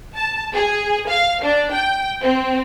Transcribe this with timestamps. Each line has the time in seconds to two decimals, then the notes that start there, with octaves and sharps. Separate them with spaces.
0.16 A5
0.54 G#4
1.08 F5
1.43 D4
1.73 G5
2.22 C4